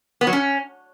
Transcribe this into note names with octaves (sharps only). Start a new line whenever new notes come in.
B3
F#3
C#4